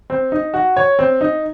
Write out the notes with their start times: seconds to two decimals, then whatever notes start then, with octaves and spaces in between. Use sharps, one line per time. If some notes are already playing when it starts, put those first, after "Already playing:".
0.10 C4
0.32 D#4
0.54 F#4
0.77 C#5
0.99 C4
1.21 D#4